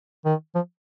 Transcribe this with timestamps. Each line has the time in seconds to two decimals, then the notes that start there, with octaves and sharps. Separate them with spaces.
0.25 D#3
0.55 F3